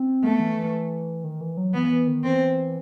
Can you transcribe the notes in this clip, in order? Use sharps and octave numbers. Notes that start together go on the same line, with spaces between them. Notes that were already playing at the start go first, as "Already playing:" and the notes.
Already playing: C4
A3 B3
E3
E3
D#3
E3
F#3
E3 B3
E3
D#3
E3 C4